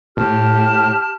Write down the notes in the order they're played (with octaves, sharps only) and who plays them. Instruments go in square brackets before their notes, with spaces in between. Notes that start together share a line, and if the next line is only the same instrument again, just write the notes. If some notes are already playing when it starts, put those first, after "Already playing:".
[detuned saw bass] A2 [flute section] G4 A5 F6